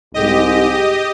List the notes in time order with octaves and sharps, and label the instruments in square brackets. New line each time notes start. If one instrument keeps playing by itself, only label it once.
[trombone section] C2 G#2 [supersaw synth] G4 D#5